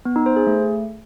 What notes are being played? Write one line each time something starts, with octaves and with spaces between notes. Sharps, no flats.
B3
D#4
C5
G#4
A3